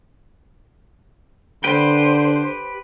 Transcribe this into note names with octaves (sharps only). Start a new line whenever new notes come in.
D3 G4 B4 C5 G5